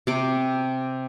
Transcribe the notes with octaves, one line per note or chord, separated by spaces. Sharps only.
C3 D6